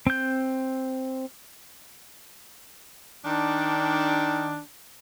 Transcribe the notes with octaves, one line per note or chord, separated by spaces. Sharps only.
C4 G6
D#3 D4